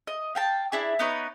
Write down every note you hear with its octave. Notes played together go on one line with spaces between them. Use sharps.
D#5
F5 G5 A5
D4 E4 G#4
B3 D#4 B4 C#5